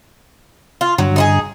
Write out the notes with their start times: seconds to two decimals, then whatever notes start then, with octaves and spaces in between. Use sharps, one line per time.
0.81 F4
0.98 G2 D3 F#3
1.16 D#4 E4 G#4